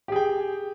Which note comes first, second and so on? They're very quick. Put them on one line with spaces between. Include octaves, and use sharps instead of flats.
G4 G#4 G5